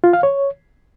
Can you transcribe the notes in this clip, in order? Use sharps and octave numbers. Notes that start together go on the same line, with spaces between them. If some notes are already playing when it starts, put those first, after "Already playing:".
F4
F5
C#5